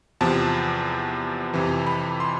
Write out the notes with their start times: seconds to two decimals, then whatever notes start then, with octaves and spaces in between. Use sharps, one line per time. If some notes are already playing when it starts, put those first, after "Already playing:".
0.21 E2 C3 F3 A5
1.54 F2 C3 E3
1.86 B5
2.20 C6